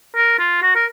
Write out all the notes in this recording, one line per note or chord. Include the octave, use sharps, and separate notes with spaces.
A#4
F4
F#4
A#4